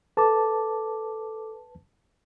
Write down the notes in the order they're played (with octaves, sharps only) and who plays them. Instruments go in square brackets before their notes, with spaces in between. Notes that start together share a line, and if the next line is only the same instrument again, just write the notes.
[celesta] A4 D6 [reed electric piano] B4 A5